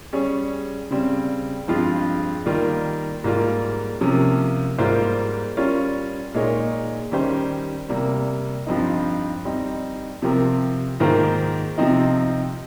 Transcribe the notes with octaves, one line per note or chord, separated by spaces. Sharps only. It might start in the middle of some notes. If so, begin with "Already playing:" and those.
G3 C#4 G#4 C#5
C#3 G3 C4
G2 F3 G#3 C4 F4
D#3 G3 A#3 F4 A#4
G#2 G3 A#3 F4
C3 F3 A#3 C#4
G#2 G3 A#3 F4 C5
G3 C#4 F4 A#4 C#5
A#2 G#3 D#4 A#4 C#5
D#3 G3 C#4 G4 C5
C3 G3 A#3
G2 F3 C4 D#4
G3 C4 D#4
C3 F3 C4 G4 A#4
G#2 D#3 A#3 F4 C5
C3 F3 C4 D#4